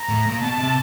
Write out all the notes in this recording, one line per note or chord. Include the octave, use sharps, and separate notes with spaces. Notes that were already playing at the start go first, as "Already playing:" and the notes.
Already playing: A#5
A2
A#2
B2 A5
C3